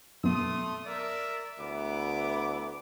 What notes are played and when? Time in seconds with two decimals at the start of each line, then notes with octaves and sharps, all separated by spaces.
0.24 F#2 B2 A3 C6 D#6
0.86 A#4 D5 E5
1.59 D2 B3 E4 D6